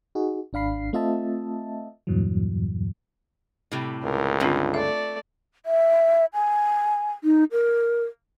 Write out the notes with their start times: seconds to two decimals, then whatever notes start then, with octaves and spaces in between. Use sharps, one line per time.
0.15 D#4 F#4 G#4
0.53 G#1 D4 F5 B5 C7
0.93 A3 C4 F4 D#5 E5 A5
2.07 E2 G2 A#2 E3 F#3
3.72 A2 C3 G3
4.03 C#2 A#4
4.40 G2 D3 C4 D4 F4
4.74 A3 D5 E5
5.66 E5
6.34 G#5
7.24 D#4
7.52 A#4